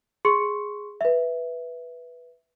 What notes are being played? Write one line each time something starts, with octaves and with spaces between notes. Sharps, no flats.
G#4 C6 C#6 C#7
B4 E5